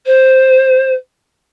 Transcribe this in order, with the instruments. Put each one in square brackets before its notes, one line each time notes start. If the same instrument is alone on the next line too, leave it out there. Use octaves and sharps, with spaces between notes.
[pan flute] C5